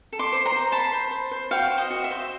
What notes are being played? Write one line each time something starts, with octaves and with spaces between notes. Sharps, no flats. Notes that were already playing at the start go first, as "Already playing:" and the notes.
A4
C6 D6
C5
A#5 C6
C5
C5 A5 B5
C5
C5
C5
F#4 F5 G5
C5
D#5
F#4
E5
C5